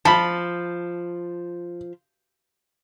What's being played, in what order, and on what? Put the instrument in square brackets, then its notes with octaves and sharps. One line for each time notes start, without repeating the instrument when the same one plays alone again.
[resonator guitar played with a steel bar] F3 [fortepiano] A5 B5